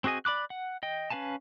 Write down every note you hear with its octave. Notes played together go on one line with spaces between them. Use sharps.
C4 F#4 G#4 D#5 G#5
D5 B5 D6 F#6
F#5
D#5 G5
C#4 B4 F5 G#5 A5